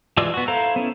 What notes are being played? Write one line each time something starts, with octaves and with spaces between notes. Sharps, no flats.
E3 G#3 F4 D5 E6
B3 F#4
E4 A4 C5 F5 A#5
B3 C#4 E4